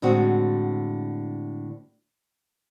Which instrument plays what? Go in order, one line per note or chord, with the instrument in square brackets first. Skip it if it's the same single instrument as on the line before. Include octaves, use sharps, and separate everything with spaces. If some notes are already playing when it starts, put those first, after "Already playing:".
[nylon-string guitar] A2 D3 G#3 C4 F#4